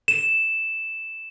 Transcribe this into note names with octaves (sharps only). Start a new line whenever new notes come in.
E7